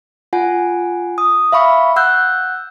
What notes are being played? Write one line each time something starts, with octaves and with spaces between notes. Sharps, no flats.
F4 F#5 G#5
D#6
E5 F5 B5 C#6
F#5 E6 F#6 G6